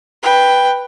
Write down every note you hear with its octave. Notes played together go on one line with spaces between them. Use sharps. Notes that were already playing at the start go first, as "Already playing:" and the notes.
B4 G5